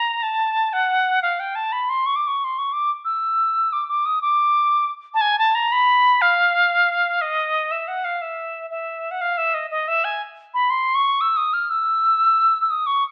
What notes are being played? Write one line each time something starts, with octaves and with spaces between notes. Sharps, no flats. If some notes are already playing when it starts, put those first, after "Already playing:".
Already playing: A#5
A5
F#5
F5
G5
A5
B5
C6
C#6
D6
C#6
C6
C#6
D6
E6
D6
D6
D#6
D6
A5
G#5
A5
A#5
B5
F5
D#5
E5
F#5
F5
E5
E5
F#5
F5
E5
D#5
D#5
E5
G#5
B5
C6
C#6
E6
D#6
F6
E6
E6
D#6
C#6